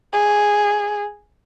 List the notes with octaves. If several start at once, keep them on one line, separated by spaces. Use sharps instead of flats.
G#4